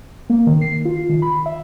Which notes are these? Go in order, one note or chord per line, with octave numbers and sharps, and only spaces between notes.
A#3
D#3
C7
F4
D#3
B5
E5